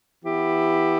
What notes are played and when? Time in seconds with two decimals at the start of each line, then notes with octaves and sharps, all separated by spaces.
0.23 E3 B3 E4 G4